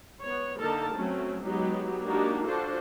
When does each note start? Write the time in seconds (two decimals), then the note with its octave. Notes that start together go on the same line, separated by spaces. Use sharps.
0.23 B3 C#5
0.59 D3 A#3 D#4 A4 A#4 A5
0.96 F#3 A3 C4 C#4
1.43 F#3 G#3 B3 D#4 G4
2.04 A#3 D4 D#4 F#4 G4
2.46 D4 F4 F#4 A4 C5